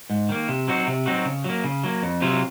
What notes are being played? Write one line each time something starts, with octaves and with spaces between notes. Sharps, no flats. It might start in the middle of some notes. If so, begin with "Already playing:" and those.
G#2
D#3 A#3
C3
F#3 C4 D#4 F#4
C3
F#3 C4 D#4 F#4
C#3
F#3 A#3
C#3
F#3 A#3
F2
C3 F#3 C4 F4